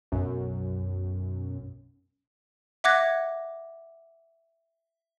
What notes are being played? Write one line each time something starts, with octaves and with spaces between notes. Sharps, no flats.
B1 F#2
E5 F#5 D6 F#6 G#6 A#6